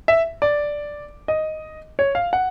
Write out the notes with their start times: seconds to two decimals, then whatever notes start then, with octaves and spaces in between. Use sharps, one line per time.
0.08 E5
0.42 D5
1.28 D#5
1.99 C#5
2.15 F5
2.33 F#5